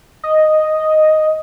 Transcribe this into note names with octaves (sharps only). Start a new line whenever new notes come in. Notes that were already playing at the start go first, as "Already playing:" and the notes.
D#5